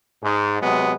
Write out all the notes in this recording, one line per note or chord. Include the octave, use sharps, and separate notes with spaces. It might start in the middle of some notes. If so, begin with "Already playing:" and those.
G#2
C3 F#3 G#3 B3